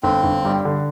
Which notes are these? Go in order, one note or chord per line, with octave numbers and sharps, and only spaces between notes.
G1 C4
G1
G2
D3